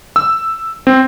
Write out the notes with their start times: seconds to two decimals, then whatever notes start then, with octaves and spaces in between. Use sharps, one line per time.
0.16 E6
0.87 C4